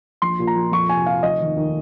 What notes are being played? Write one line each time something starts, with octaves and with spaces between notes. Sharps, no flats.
A#1 C6
A#2
A#5
F3
F2 C#6
C3 G#5
F3 F5
F1 D#5
D#2
D#3